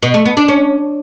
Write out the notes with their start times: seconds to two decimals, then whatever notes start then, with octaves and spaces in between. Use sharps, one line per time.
0.03 B2
0.14 A3
0.25 B3
0.37 D4
0.48 C#4